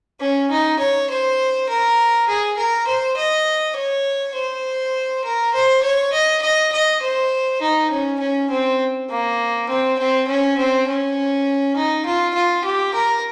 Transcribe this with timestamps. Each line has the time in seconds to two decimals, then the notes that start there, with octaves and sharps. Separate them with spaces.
0.20 C#4
0.51 D#4
0.79 C#5
1.10 C5
1.69 A#4
2.28 G#4
2.58 A#4
2.87 C5
3.17 D#5
3.76 C#5
4.35 C5
5.24 A#4
5.54 C5
5.83 C#5
6.13 D#5
6.42 D#5
6.73 D#5
7.02 C5
7.62 D#4
7.91 C#4
8.20 C#4
8.50 C4
9.10 A#3
9.69 C4
9.99 C4
10.28 C#4
10.58 C4
10.87 C#4
11.76 D#4
12.06 F4
12.35 F4
12.65 G4
12.94 A#4